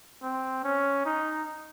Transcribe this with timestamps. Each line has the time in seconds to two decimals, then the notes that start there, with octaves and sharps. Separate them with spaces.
0.22 C4
0.64 C#4
1.05 D#4